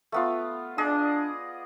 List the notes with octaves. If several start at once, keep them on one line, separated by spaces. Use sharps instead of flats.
A3 B3 F4
D4 G#4 D5 D#5